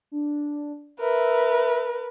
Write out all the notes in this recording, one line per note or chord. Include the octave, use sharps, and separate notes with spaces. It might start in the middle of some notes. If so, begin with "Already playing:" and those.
D4
A#4 B4 E5